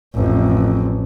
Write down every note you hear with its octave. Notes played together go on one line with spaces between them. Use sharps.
A1 F2